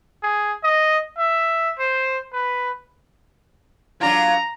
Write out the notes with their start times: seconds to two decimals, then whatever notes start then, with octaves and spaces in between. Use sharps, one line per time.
0.23 G#4
0.64 D#5
1.18 E5
1.79 C5
2.33 B4
4.01 F#3 D4 F4 A#5